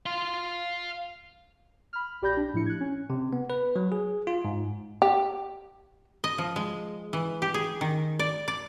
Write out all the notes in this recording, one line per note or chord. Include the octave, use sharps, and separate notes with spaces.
F5 C6
B5 F6
A#1 G4 D5 B5 G6 A#6
D4
A2 F3 E4 C#7
F#6 G#6
C#4
C3
B3
B4
F#3
G#4
F4
G#2
G4
D#5
F3
G#3
E3
G4
G#4
D#3
D5
D5